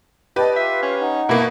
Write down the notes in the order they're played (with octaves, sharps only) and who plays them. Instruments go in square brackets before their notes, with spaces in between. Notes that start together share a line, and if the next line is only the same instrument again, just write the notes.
[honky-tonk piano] G4 B4 [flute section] D5 D#5 A5
[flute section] F4 [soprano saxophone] E5
[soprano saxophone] C#4
[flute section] D#4 F#5
[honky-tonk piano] B2 A#3 [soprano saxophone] E4